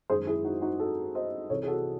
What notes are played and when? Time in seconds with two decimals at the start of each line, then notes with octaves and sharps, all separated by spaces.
0.10 F#2 D#3 G#3 G#4 C5
0.27 E4 G#4
0.45 D#4 F#4
0.62 D#4 F#4
0.80 F#4 A4
1.15 C5 D#5
1.50 C2 C3 E3 A4 C#5
1.63 G#4
1.68 F#4 A4